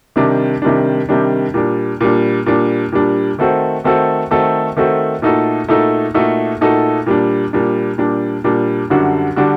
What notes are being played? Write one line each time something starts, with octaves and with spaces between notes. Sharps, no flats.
C3 D#3 G3 D4
C3 D#3 G3 D4
C3 D#3 G3 D4
A#2 G3 D4
A#2 G3 D4
A#2 G3 D4
A#2 G3 D4
D#3 A3 C4 F#4 A4
D#3 A3 C4 F#4 A4
D#3 A3 C4 F#4 A4
D#3 A3 C4 F#4 A4
A#2 A3 D#4 F#4 A4
A#2 A3 D#4 F#4 A4
A#2 A3 D#4 F#4 A4
A#2 A3 D#4 F#4 A4
A#2 G3 D4
A#2 G3 D4
A#2 G3 D4
A#2 G3 D4
F#2 D3 G3 D4 F#4
D3 G3 D4 F#4